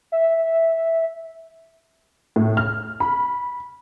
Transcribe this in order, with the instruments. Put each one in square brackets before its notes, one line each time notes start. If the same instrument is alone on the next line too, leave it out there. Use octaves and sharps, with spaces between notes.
[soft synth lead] E5
[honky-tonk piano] A2
F6
B5